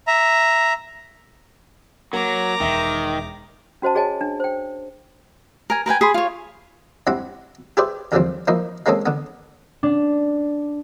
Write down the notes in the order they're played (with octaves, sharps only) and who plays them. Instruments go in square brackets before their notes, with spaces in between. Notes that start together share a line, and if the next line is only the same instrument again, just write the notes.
[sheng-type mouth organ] E5 A#5
[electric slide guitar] F#3 [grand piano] A#3 [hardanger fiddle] A#5 D6
[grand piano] E1 E5 A#6 [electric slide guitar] D#3
[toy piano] C#4 F#4 C5 D#5 A5
F#4 G#4 C#5 D#5 G#5 A5
D4
C5 G5
[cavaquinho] A#4 G#5
A#4 B4 G5 G#5
G#4 B5 C6
F4 C#5
[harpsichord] G2 C4 E4 F#5 B5
G4 G#4 B4 C5 D5 E5
D#2 D3 E3 F3 G3 C4
F3 A#3 D#4 E4
G#3 A#3 C4 C#4 D#4 A4
D3 B3
[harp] D4